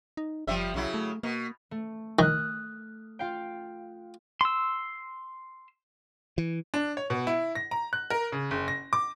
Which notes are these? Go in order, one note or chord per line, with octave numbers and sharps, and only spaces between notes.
D#4
F#1 F3 G3 E5
B1 C#3 F#3 E4
A3
B2 A#3
A3
D#3 D#6 F6 F#6
F4 F5 G5
C6 E6
E3
D4
C#5
B2
E4
A#6
A#5
F#6
A#4
C#3
F#1
A#6
D6